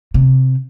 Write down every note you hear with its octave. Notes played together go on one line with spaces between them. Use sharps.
C3